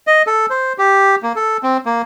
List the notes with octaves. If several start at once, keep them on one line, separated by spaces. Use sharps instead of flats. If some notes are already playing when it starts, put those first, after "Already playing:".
D#5
A4
C5
G4
A#3
A4
C4
A#3